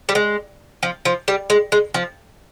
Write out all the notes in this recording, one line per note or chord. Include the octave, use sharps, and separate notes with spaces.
G3
G#3
F3
F3
G3
G#3
G#3
F3